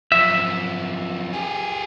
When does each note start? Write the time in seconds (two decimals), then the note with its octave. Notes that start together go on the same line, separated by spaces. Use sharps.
0.12 F#2 F3 E5
1.33 G4 G#4